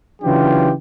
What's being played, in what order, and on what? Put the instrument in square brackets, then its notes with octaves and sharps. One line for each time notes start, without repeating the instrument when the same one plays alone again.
[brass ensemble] C#3 E3 F#3 D4 F4 G4